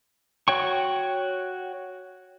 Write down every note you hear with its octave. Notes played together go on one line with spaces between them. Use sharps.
F#4 C#5 G5 C#6